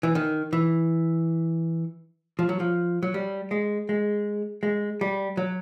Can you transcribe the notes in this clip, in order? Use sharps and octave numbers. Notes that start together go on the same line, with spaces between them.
E3
D#3
E3
F3
F#3
F3
F#3
G3
G#3
G#3
G#3
G3
F#3